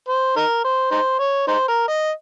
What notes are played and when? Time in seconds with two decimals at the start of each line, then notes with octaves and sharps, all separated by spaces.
0.09 C5
0.36 D#4 A#4
0.64 C5
0.91 D#4 C5
1.19 C#5
1.48 D#4 C5
1.68 A#4
1.88 D#5